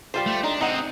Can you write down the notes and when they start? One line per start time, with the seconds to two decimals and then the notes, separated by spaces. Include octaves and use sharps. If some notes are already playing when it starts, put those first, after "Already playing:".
0.14 G3 F4 C5
0.26 A3
0.44 D4 D#4
0.61 C4 D#4 G#4 F#5